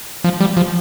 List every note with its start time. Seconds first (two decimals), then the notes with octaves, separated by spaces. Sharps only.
0.24 F3
0.41 G3
0.57 F3